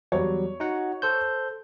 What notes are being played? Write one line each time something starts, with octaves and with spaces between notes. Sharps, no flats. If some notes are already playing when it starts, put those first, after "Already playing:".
E2 F#3 G3 C#5
D#4 F#4 F#5
A4 C5 G6